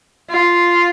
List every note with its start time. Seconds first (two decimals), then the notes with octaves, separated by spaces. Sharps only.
0.30 F4